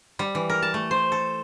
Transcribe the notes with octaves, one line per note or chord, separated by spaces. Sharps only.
G3
E3
A#4
A5
A3
C5
A4